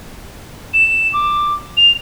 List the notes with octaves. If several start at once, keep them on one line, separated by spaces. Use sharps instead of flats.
E7
D6
F7